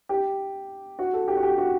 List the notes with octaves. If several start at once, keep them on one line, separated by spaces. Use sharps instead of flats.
G4
F#4
A4
G4
F#4
G4
F#4